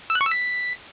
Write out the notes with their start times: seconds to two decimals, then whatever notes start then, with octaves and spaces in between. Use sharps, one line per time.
0.10 E6
0.15 F#6
0.21 C#6
0.26 E6
0.31 B6